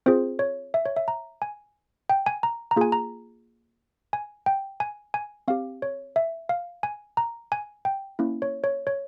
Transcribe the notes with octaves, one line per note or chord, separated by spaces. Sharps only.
C4 F4 G#4 C5
C#5
E5
C#5
E5
A#5
G#5
G5
G#5
A#5
A#5
A#3 F4 G#4 G#5
A#5
G#5
G5
G#5
G#5
C4 G4 F5
C#5
E5
F5
G#5
A#5
G#5
G5
A#3 C#4 E4
C#5
C#5
C#5